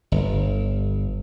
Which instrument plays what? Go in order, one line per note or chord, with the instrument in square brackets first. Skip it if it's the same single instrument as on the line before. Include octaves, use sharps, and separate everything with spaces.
[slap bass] G1